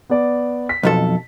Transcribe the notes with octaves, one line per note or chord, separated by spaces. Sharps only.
B3 D5
B6
B1 F2 A4